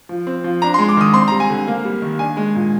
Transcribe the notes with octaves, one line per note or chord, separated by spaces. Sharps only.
F3
C4
F3
D4 A#5
G#3 C6
D6
D#3 D#6
C4 C6
G3 A#5
G#5
D3
A#3
G3
D#3
D4 G#5
G#3
A#2